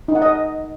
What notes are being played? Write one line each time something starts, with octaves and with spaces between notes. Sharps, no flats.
D#4
F#5
D#5